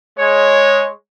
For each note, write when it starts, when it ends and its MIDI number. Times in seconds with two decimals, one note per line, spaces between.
0.19 0.88 56
0.19 0.88 73